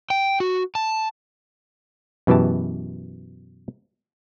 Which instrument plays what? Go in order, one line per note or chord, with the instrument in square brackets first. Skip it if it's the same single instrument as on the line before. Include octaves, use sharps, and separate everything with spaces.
[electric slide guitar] G5
F#4
A5
[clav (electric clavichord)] F#2 B2 E3 G4 A5